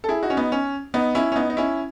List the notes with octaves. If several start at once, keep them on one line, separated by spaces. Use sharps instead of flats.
A4
E4 G#4
D#4 F#4
C#4
B3 D#4
C#4
B3 D#4
C#4 E4
C#4
B3 D#4
D#4
C#4 E4